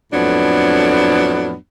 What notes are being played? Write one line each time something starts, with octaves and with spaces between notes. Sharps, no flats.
F2 A2 F#3 B3 D4